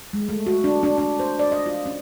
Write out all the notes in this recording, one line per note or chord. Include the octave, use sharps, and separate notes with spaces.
G#3
A3
F#4
D4
D4
D4
C5
D5
D#5
F4
C#4